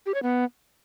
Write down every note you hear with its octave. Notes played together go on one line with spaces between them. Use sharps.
G4
C#5
B3